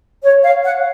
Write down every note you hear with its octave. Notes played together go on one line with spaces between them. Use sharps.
C#5
F5
F#5